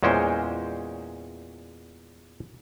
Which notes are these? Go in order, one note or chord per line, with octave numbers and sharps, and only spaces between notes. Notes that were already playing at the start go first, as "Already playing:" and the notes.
E2 A#2 G#3 C#4 C5 G5